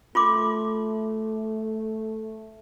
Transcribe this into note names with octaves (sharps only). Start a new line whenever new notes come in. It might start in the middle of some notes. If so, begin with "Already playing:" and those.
A3 F4 C6 D6